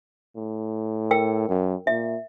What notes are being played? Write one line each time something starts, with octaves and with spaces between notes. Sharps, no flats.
A2
A#4 G5 E6
F#2
A#2 E5